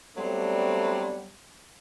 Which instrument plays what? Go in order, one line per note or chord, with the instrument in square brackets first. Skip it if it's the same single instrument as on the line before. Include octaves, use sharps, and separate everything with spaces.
[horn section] F#3 G3 A3 B3 C4 D4